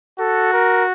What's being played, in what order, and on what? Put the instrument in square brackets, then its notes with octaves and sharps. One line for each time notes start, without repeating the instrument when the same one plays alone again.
[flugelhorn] F#4 [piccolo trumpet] A4
[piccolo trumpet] A#4